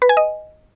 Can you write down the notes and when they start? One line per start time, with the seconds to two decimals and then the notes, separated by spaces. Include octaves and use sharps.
0.02 B4
0.09 G#5
0.17 D#5